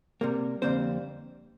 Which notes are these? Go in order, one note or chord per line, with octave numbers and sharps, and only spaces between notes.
C3 G3 A#3
F2 D3 G3 A#3 C4 C5